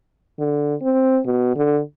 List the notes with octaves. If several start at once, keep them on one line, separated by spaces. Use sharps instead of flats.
D3
C4
B2
D3